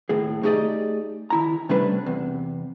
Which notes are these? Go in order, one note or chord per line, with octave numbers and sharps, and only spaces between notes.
D#2 A2 G#4
A3 D#4 G4 G#4 D5 D#5
D#3 E4 A#5
C3 G3 A3 C#4 D4 B4
E2 C3